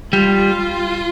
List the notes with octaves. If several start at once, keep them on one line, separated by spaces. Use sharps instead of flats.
G3 F4